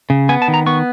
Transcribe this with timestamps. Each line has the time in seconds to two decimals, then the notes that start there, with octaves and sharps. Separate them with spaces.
0.10 C#3
0.29 B3 G#5
0.42 A5
0.48 D#3
0.54 A#5
0.66 B3 C#6